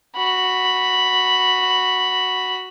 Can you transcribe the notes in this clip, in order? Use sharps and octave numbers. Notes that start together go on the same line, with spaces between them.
F#4 B5